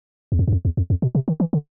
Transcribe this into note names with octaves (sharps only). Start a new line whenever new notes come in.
E2
F2
F#2
F2
E2
F2
F2
B2
C3
D#3
E3
D3